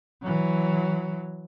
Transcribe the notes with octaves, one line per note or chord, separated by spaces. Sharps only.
E3 F#3